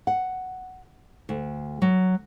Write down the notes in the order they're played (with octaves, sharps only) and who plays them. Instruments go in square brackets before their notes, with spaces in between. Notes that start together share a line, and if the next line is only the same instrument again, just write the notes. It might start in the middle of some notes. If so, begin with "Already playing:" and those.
[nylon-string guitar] F#5
D2
F#3